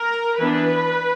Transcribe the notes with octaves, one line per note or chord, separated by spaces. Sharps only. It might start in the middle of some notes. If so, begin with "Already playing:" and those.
Already playing: A#4
E3 B3 D4 B4